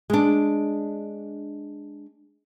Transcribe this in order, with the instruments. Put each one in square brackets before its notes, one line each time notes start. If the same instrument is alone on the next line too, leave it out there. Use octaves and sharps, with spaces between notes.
[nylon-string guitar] G#3 D4